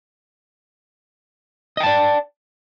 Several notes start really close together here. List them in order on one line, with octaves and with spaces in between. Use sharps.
D#5 G5 A5 D5